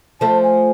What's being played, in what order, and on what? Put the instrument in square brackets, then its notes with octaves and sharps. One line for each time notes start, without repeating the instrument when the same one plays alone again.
[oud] F3 A3 [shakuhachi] A5
[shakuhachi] G#5